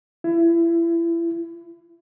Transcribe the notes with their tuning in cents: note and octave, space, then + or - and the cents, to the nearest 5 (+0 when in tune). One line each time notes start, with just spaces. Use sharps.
E4 +30